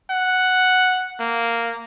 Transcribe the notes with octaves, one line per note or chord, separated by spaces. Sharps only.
F#5
A#3